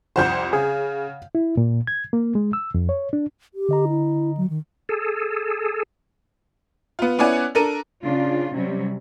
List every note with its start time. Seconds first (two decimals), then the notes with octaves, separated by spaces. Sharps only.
0.16 C2 F2 C5 F#5 G6
0.53 C#3 G#4
1.35 E4
1.57 A#2
1.87 G#6
2.13 A#3
2.35 G#3
2.53 E6
2.75 F2
2.89 C#5
3.13 D4
3.54 G4
3.69 D3 D#5 A#5
3.88 E4
4.37 F#3
4.50 D#3
4.89 G#4 A4
6.99 B3 F4
7.18 B3 C#4 E4 D5 F#5 G#5
7.55 D4 A4 A#4 D#7
8.03 C#3 D4 F4
8.54 C3 F#3 G3 C#4